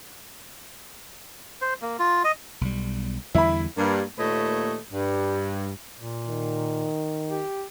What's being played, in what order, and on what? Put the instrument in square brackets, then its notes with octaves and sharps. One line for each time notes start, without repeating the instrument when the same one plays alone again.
[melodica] C5
A#3
F4
D#5
[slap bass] B1 G3
[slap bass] E2 D3 G3 [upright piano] E4 B5
[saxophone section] G2 A#3
D#2 A#2 A3 B4 C#5 D#5
G2
[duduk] A#2
[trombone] D#3
[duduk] G4